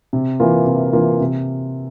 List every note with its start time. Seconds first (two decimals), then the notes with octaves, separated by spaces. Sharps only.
0.13 C3
0.40 E3 A#3 F4
0.66 C3
0.93 E3 A#3 F4
1.20 C3